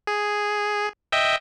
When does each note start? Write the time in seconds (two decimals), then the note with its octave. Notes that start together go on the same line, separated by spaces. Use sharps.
0.07 G#4
1.12 D#5 E5 G5